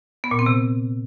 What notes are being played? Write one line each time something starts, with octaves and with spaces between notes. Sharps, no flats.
B3
A#2
C4
C3